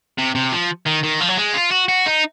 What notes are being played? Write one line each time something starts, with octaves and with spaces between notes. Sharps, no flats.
C3
C3
F3
D#3
D#3
F3
F#3
G#3
F4
F#4
F#4
D#4